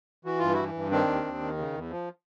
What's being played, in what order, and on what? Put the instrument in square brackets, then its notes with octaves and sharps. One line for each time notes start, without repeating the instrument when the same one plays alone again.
[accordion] E3 F#4
G2 F4
E4 F#4
E3
G2
D#3 C4 D4
D#2
D#2
D#3
C#3
E2
F3